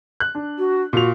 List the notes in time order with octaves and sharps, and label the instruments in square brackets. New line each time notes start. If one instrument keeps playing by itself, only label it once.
[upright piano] F#6
D4
[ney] F#4
[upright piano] A#2 F7 [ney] F#4